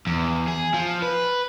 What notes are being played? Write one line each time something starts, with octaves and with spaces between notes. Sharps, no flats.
E2
G#4
F3
B4